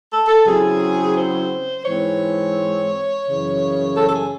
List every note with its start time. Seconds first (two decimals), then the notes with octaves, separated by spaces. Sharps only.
0.11 A4
0.28 A4
0.45 C#3 F#3 C4 E4 G#4
1.15 C5
1.85 G#2 E3 G#3 C4 C#5
3.26 F#2 C#3 E3
3.96 A4
4.08 A4
4.12 G#4